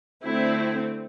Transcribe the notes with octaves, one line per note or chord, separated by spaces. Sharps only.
D3 A3 C4 E4